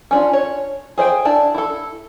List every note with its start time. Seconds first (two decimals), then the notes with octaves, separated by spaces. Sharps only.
0.11 C#4 D4 F4
0.33 C#5
0.98 G#4 C5 D#5 G5
1.25 D4 E4 A5
1.54 E4 A4